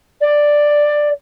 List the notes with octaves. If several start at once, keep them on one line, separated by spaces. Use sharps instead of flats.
D5